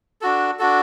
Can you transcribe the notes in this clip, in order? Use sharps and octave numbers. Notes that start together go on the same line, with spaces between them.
D4 F#4 A4
D4 F#4 A4